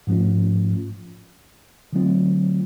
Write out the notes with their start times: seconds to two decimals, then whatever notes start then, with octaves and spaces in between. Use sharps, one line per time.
0.07 G#2 F3 A3 C#4 F4
1.93 D3 F#3 A3 C4 F4